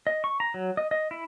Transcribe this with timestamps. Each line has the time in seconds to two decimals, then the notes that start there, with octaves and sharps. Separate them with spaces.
0.07 D#5
0.24 C#6
0.40 A#5
0.54 F#3
0.77 D#5
0.91 D#5
1.11 E4